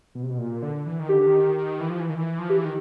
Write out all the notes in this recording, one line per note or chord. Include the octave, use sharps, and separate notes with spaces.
B2
C3
B2
A#2
D3
E3
D#3
D3 G4
D#3
E3
F3
E3
D#3
E3
F3
E3 G4
D#3